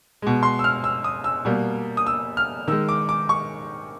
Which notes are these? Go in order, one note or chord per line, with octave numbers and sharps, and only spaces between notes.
B2 G#3
C6
E6
F6
E6
D#6
E6
B2 G3 A#3
D#6
E6
F6
D#3 G#3 E6
D6
D6
C#6